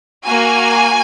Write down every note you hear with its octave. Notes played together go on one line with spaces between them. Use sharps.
A#3 F#4 G#5